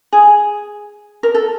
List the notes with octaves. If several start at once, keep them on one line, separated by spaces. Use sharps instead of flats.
G#4
A#4
A4